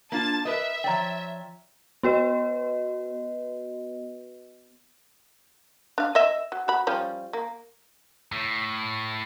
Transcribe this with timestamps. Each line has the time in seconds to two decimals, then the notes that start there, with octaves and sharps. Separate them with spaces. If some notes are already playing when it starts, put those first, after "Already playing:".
0.12 A#3 D4 F4 A5 A6
0.45 A#4 B4 D#5 E5
0.84 F3 C#5 D5 G5 A#5
2.03 B3 F#4 B4 D#5
5.98 D4 F5
6.15 D#5 E5
6.52 F#3
6.68 F#4 B5
6.87 F3 G3 C#4
7.33 A#3
8.32 A2